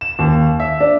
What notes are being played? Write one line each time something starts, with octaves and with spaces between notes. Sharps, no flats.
E7
D#2
E5
D4